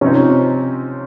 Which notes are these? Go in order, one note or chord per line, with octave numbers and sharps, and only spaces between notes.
C3 F3 C4 C#4 D#4